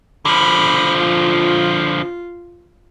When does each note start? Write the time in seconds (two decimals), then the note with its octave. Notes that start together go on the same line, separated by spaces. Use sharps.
0.25 D3 F3 B5
0.97 F4